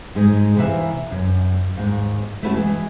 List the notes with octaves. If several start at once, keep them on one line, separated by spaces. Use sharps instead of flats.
G#2 G#3 D#4
C3 E3 A#3 B4 E5
F#2
D#2 G#2 A#3
A3 B3 C#4 E4 F#4 A4
E3 G#3